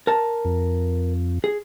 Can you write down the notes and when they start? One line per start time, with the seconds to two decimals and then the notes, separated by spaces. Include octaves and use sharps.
0.07 A#4 A5
0.45 F2
1.44 G#4